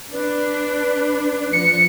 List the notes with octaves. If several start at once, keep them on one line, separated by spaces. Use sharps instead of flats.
D4 B4
F3 C#7